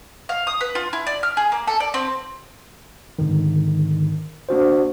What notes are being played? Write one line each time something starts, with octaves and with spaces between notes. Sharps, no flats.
F5
D#6
B4
F4
E4
D5
F6
G#4
A#3
A4
D5
C4
G#2 D3 D#3
A#3 D4 F#4 C5